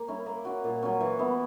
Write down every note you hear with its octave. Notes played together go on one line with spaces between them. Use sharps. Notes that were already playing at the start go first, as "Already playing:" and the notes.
Already playing: A#3
C#4 E4 A#4
A#3
C#4 F#4
A#2
F#3 C#4
E3
B3 E4